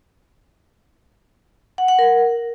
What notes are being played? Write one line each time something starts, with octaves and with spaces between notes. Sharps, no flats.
F#5
F#5
A#4